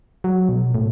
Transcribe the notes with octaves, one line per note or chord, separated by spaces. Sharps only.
F#3
B2
A2